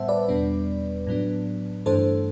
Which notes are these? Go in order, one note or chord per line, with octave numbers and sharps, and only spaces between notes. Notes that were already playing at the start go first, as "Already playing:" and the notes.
Already playing: A2 G3 B3 C5 E5 F#5 A5
B4 D5
E2 B2 G3 B3 D4
A2 F#3 B3 D4
G2 E3 A3 D4 A4 C5